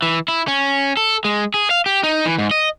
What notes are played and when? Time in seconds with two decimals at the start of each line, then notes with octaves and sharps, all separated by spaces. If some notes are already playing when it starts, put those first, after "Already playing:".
0.02 E3
0.28 E4
0.48 C#4
0.97 A4
1.25 G#3
1.54 G#4
1.71 F5
1.86 G4
2.03 D#4
2.25 E3
2.39 G#2
2.51 D#5